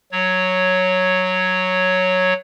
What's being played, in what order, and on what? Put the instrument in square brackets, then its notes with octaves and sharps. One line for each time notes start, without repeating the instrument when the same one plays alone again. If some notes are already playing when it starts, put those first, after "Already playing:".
[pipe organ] F#3 C#5